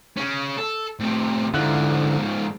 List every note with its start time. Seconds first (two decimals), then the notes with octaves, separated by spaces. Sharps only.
0.17 C#3 C#4
0.58 A4
1.00 A2 C3
1.54 G#2 D3 F3 E4 F#5